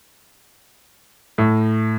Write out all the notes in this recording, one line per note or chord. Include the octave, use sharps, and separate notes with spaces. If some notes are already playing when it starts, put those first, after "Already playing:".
A2